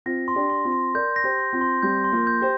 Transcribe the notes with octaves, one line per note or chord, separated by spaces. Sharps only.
C4 F4 A#6
C6
D4 G4
C6
C4 F4
C6
A#4 D5 G6
A#6
G4 C5
C6
C4 F4
C6
G3 C4 G6
C6
F3 A#3
G6
G4 C5